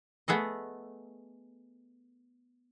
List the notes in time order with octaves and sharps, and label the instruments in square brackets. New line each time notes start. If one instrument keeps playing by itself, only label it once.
[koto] A3 B3 G#4 A4 D#5